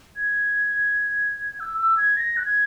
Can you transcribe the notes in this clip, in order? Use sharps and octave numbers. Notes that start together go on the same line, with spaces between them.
G#6
E6
E6
G#6
A#6
F#6
G#6